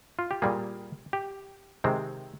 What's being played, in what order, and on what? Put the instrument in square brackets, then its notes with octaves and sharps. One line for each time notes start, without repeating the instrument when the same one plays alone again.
[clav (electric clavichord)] F4
G4
A#2 G3 A#3 G#4
G4
C3 D#3 G#3 C4